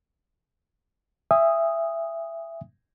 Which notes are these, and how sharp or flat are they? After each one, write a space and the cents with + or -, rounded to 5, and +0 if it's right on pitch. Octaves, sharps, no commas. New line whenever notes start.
E5 +15 G#5 -40 D#6 +0